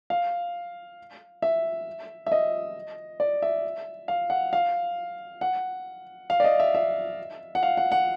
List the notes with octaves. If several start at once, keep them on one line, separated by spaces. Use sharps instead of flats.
F5
E5
E5
D#5
D5
E5
F5
F#5
F5
F#5
F5
D5
D#5
E5
E5
F#5
F5
F#5
F#5